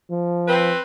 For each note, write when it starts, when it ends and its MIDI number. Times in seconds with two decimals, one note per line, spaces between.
0.11 0.74 53
0.48 0.80 60
0.48 0.80 71